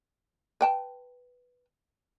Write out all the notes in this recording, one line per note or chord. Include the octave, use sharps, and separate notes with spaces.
B4 G5 A5